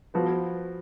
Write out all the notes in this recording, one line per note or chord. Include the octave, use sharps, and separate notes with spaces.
F3 B3 F#4